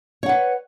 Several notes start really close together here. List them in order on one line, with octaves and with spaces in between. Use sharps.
C#5 F#5 B4